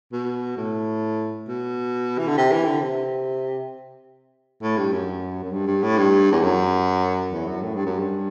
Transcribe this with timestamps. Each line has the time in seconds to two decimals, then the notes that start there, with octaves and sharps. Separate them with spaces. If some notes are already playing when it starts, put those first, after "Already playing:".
0.12 B2
0.57 A2
1.48 B2
2.18 E3
2.27 D3
2.37 C3
2.52 E3
2.67 D3
2.82 C3
4.62 A2
4.77 G2
4.92 F#2
5.43 F#2
5.52 G2
5.67 G2
5.82 A2
5.97 G2
6.31 E2
6.43 F#2
7.33 E2
7.47 F#2
7.62 A2
7.74 G2
7.86 F#2
7.99 G2